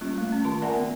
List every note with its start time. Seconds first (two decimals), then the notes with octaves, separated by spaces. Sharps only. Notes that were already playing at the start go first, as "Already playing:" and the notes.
0.01 G3 A#3 C#4 F4
0.18 A3
0.32 C#4
0.44 D#3 F4 A5
0.62 A#4 D5 E5 F#5 G#5 A#5
0.77 B3